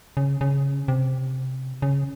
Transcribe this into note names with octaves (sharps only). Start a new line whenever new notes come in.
C#3
C#3
C3
C#3